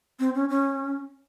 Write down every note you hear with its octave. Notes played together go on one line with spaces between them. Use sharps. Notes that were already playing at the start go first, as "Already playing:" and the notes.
C4
C#4
C#4